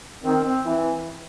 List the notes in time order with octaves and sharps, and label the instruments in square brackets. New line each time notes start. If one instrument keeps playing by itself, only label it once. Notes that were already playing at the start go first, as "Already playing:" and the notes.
[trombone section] D#3 [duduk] C4
[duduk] C4
[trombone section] E3